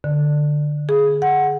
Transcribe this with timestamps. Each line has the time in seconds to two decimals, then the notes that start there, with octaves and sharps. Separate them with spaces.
0.04 D3
0.89 G#4
1.22 F#5